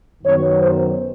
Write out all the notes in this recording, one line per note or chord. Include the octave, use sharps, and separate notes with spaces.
F#2 D#3 F#3 B3 C#5
C5